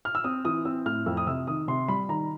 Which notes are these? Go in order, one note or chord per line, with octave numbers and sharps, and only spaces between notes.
F6
E6
C4 D#6
E3 D#6
C4 E6
A2 F6
F2 E6
D#6
C3 E6
D#3 D#6
C3 C6
G3 B5
D#3 A#5